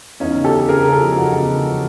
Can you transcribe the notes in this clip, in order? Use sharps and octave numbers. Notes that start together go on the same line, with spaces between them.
E2 C#4 D#4
C#3
G4 A4
C#3
A4
C#3 G#4 A#4
C#3 A#4
G4 A4
F3
E2 F#4 G#4
C#3
C#3
F3